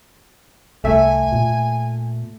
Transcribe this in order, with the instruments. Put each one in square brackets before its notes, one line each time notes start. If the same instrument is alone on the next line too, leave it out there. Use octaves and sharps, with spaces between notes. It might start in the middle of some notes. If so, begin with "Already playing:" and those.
[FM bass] C2 [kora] A3 E5 [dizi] G#5
[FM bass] A#2